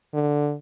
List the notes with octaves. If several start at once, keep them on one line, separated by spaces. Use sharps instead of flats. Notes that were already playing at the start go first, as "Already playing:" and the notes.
D3